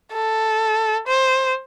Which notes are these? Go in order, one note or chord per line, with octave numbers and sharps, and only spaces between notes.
A4
C5